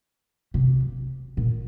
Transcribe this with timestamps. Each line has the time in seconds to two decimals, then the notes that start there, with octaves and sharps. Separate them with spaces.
0.54 C3
1.37 A#2